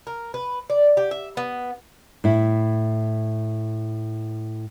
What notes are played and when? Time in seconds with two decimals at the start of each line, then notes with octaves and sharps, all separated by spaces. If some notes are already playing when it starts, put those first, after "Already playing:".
0.07 A#4
0.34 B4
0.70 D5
0.97 G4
1.11 E5
1.37 B3
2.24 A2 E4